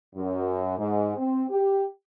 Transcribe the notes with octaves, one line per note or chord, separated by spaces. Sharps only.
F#2
G#2
C4
G4